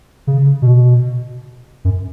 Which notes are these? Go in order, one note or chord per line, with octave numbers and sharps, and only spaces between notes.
C#3
B2
F#2